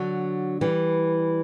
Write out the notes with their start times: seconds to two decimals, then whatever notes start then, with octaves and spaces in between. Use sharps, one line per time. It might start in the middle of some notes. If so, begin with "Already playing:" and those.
Already playing: D3 F#3
0.61 E3 G3